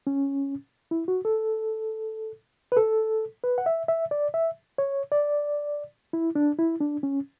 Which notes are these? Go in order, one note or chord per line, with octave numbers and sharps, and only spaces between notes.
C#4
E4
F#4
A4
B4
A4
B4
F#5
E5
E5
D5
E5
C#5
D5
E4
D4
E4
D4
C#4